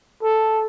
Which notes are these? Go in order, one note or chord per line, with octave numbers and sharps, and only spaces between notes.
A4